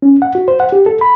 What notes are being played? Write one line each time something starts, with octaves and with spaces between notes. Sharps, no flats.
C#4
F#5
F#4
C5
F#5
G4
A4
B5